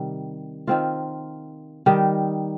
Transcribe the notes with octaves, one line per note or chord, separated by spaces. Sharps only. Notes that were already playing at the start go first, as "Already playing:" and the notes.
Already playing: C3 D#3 G3
D#3 C4 F4
D#3 G3 D#4